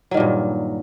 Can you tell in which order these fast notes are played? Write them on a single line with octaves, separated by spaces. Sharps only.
F#3 D#3 A#2 G2